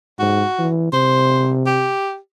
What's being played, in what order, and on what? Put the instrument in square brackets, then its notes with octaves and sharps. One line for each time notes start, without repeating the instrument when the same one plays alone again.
[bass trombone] G#2 [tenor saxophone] F#4
[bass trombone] E3
[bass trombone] C3 [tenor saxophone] C5
[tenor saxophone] G4